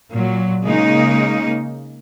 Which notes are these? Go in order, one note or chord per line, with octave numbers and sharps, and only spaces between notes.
A#2 F#3
C#3 G#3 A#3 D#4